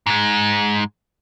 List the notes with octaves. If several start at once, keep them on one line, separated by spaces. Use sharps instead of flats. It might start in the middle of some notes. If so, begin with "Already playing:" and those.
G#2 G#3